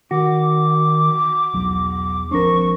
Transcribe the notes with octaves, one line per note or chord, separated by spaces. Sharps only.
D#3 F#4 D6
B1 E2 F#3
G#1 F3 C4 D4 A#4 C#6